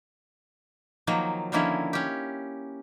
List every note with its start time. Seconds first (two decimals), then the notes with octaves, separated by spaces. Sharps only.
1.07 D#3 F3 F#3 A#3
1.52 D3 D#3 F3 A#3 C#4 E4
1.93 C#4 G4